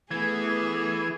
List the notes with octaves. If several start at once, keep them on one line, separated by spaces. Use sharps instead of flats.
E3 A3 B3 G#4 G#6